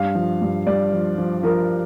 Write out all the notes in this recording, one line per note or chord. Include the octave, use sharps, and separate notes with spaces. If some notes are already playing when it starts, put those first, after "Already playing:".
Already playing: G2 F5
F3
G2
G2 D5
F3
F3
F3 A#4